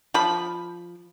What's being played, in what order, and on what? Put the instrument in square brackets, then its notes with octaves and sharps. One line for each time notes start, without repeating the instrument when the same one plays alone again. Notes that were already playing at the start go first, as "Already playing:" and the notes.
[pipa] F3 B5